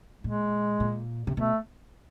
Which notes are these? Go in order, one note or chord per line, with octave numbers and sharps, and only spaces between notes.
A#2 G#3
A#2
C3
B2 A3